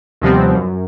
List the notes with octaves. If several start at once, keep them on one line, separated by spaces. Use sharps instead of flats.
D#2 C3 F3 G3 B3 C4
F#2